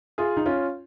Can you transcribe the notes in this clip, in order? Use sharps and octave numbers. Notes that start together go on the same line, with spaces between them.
F4 G#4
D#4
C#4 F4